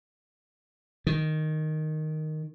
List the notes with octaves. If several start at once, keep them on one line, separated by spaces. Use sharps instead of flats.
D#3